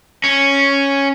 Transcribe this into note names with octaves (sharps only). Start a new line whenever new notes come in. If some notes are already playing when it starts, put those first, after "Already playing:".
C#4